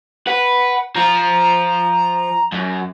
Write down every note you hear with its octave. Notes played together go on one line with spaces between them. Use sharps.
B4 F#5
F3 F4 A#5
F#2